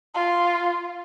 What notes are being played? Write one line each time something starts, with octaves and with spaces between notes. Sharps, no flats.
F4